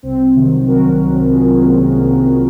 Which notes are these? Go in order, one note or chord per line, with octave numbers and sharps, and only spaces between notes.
C2 C4
C3 D#3 F#3
C2 F#4 A#4
C3 D#3 F#3
C2 F4 G#4
C#4 F4
C3 D#3 F#3 A#3 C#4
A#3
C2 A#3
C3 D#3 F#3 C4